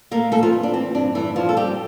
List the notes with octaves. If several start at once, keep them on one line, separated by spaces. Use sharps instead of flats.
A3 A#3 A#4
E3 A3 A4
F3 F4
E3
D4
E3 C4
G2 D4
E3 A3 E4
G2 F3 F4
A4
G2 G3 G4